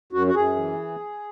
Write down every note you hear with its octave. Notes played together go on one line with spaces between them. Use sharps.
F#2 F#4
F#4
F#2 G#4
E3